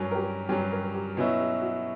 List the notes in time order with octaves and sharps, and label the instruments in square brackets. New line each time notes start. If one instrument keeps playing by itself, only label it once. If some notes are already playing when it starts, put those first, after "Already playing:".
Already playing: [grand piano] G2 F#3 C#4 [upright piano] A#4
[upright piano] A#4
G4
[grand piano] G2 F#3 C#4 [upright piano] G4
[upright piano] A#4
G4
[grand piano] B2 F#3 C#4 E4 [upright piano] F#4
[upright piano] G4
F#4